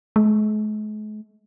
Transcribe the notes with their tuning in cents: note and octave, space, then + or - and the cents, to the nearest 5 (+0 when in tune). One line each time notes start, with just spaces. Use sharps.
G#3 +45